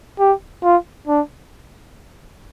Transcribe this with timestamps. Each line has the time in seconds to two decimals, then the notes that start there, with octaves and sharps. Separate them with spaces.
0.19 G4
0.63 F4
1.07 D4